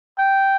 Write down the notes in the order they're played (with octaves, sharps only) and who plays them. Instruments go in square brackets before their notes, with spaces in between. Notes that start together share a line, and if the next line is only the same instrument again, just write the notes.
[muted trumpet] G5